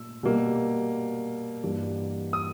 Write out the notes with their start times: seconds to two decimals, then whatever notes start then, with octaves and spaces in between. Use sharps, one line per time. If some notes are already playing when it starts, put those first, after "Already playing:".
Already playing: A#2 A3 E6
0.23 B2 G3 A#3
1.64 G2 E3 G3 A#3
2.33 D#6